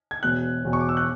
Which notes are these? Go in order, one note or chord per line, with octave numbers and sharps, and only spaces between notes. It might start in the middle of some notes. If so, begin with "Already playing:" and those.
G#6
E1 E2 B2 F#6
E1 E2 B2
C#6
D6
E6
F#6